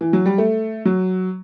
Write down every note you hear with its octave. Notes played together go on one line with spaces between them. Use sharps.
E3
F#3
G3
A3
F#3